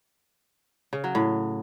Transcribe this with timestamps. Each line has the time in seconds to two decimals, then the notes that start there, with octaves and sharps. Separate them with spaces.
0.93 C#3
1.04 F#3
1.15 A2